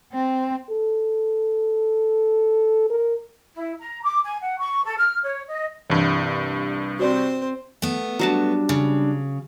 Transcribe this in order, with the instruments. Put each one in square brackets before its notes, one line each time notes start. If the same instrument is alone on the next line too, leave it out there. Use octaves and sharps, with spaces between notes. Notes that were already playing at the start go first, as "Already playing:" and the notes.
[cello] C4
[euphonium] A4
A#4
[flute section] E4
A#5
D6
G#5
F#5
C#6
A4
F6
C#5
D#5
[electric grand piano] C2 G2 [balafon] E3
[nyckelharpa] C4 C5 [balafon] F#4 D5
[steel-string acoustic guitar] A3 B3
[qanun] F#3 F#4 A5 [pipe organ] G3 D4
[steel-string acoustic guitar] C#3